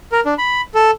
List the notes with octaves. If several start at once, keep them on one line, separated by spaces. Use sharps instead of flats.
A#4
D4
B5
A4